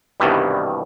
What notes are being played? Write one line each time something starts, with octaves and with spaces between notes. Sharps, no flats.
C2 G2 B2 D#3 E3 G3